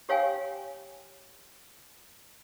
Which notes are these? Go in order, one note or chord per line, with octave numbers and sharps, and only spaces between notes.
G4 C#5 F5 G5 G#5